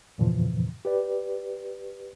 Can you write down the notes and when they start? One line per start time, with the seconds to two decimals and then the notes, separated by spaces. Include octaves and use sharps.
0.18 E2 G2 A#2 C#3 E3 F3
0.85 G4 B4 D5